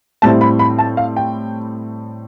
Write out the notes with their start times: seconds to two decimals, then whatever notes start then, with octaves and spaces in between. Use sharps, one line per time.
0.22 A2 G3 C4 E4 A5
0.41 B5
0.59 B5
0.79 A5
0.97 F5
1.17 G5